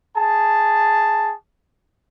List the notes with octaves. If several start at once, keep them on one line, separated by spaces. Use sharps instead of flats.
G#4 A5